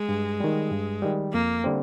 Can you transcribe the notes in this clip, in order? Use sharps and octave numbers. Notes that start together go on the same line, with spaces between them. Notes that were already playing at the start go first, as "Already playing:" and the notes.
Already playing: G#3
G2
D#3 G3
G2
D#3 G3
F2 A#3
D3 G3 C4